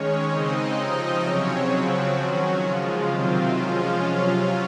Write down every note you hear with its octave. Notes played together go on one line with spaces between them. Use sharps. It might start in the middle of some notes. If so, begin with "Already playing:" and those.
Already playing: D#3 G#3 C#4 C#5
C#3 G#3 C4 D#4 D#5
C3 F3 C4
C#3 F#3 C4 C#4 C#5
C#3 F3 F#3 C4 F#4
D#3 F#3 C#4
C#3 F3 G#3 F4
C3 D#3 F#3 C4
F3 G#3 C#4 F4
C3 F#3 C#4 F4